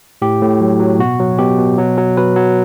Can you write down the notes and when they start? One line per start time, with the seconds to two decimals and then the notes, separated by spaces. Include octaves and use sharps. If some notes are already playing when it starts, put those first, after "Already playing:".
0.22 A2 G4
0.41 A2
0.61 F#3
0.80 F#3
0.99 B2 F#4
1.20 F#3
1.39 B2 G4
1.58 B2
1.78 F#3
1.98 F#3
2.17 F#3 B4
2.36 F#3